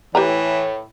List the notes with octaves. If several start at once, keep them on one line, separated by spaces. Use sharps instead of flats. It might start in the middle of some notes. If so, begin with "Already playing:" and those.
A2 E3 G4 B4 C#5 A#5